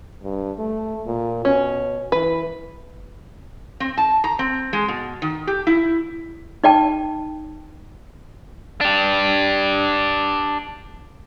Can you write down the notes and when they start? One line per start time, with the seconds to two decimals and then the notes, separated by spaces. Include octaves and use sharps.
0.23 G2
0.59 A3
1.06 A#2
1.45 B2 C#4
2.12 E3 B4
3.80 C4
3.97 A5
4.24 A#5
4.39 C4
4.73 G#3
4.88 B2
5.22 D#3
5.47 G4
5.67 E4
6.64 D#4 D5 G5 A5
8.81 D4 G4